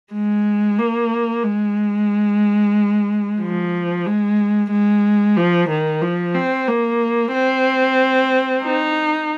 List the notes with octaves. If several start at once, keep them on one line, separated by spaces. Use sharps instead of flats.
G#3
A#3
G#3
F3
G#3
G#3
F3
D#3
F3
C4
A#3
C4
D#4